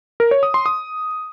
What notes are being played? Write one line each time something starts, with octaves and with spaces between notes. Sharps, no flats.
A#4
C#5
D#6
C6
D#6